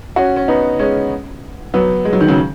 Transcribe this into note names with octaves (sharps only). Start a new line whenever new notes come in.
C#4 F#4
C#4
B3 D#4
G#3 C#4
F#3 B3
G#3
F#3
D#3
C#3 F#3